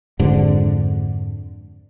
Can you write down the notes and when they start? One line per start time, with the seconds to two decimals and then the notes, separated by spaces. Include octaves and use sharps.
0.19 F2 G#2 D3